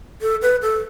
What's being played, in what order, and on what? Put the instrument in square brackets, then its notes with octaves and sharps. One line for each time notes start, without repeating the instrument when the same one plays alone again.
[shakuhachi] A4
B4
A4